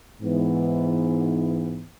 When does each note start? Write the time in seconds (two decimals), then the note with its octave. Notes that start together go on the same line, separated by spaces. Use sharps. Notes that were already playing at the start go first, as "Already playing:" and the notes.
0.21 G#2 E3 B3